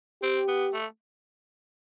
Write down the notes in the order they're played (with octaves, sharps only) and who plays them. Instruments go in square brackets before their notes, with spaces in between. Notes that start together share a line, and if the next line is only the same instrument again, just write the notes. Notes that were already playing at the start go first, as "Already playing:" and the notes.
[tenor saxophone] C4 [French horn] G4
[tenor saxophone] B3
A3